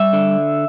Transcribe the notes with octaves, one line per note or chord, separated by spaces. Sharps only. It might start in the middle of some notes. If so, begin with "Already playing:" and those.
Already playing: G3 E5
D3